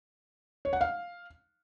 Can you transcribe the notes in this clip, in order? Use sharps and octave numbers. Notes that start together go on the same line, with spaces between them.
C#5
F#5
F5